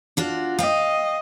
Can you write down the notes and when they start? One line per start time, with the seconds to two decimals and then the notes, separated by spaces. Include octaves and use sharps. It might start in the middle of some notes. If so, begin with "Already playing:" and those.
0.17 D4 F4 F#4
0.59 D#5 F5 G5